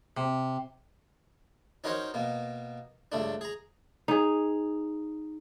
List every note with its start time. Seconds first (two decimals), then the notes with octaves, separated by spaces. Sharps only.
0.17 C3
1.84 C#4 D#4 F#4 A#4 C5 C#5
2.14 B2 A#3
3.12 C#2 G2 A3 D4
3.41 G#4 A#5
4.08 D#4 G#4